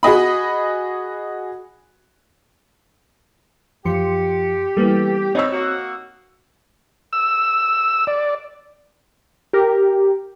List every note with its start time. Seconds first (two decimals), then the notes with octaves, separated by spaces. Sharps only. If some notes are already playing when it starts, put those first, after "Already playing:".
0.03 F#4 G#4 D#5 B5
3.85 F#2 F3 G4 C6 C#7
4.77 E3 G3 A#3 B3 A4
5.35 B2 C4 D#4 C#5 E6
5.53 A#3 D#4 F#4
7.13 E6
8.07 D5
9.53 G4 A#4